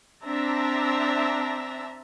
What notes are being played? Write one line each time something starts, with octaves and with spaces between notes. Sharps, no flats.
C4 D4 E5 A5 A#5